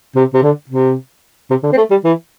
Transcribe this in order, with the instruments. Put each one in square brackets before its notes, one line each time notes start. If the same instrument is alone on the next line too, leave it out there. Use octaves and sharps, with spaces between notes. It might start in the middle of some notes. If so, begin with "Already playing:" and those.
[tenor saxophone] C3
C3
D3
C3
C3
D3
C4
A3
G3
E3